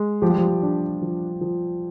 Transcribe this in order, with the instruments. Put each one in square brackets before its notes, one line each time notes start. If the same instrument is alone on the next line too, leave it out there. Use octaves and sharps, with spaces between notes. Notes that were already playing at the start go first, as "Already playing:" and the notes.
Already playing: [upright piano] G#3
[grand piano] F3 [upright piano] G4
[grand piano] G3
F3
[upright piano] D4
F3
F3